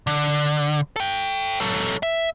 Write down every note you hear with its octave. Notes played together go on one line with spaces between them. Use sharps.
D3
A4 G5
F#3 A4
E5